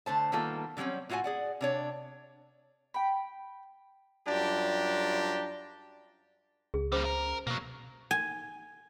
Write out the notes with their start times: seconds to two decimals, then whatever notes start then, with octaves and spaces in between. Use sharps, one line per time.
0.06 D3 A3 C5 A5
0.32 D#3 G3 A#3 B3 F4 A4
0.77 D3 F#3 G3 C4 C#4
1.10 A2 F4 F#4 F#5 G#5
1.24 G#4 D5 F#5
1.61 C3 D4 C#5
2.94 G5 B5
4.28 F#2 G3 D4 F4 G4 A#5
6.74 C#2 G#4
6.92 G3 A#3 C#4 C5 D6
7.05 A#4
7.47 B2 F#3 A#3
8.11 G#5